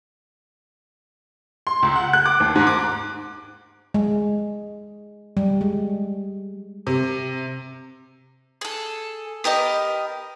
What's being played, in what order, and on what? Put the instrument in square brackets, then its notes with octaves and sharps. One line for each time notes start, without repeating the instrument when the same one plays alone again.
[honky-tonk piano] C6
C#2
F#5
F#6
D6
D#2
G#2
D6
[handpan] G#3
G3
G#3
[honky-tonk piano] C3
[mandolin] G#4 A4
B3 G4 A#4 D#5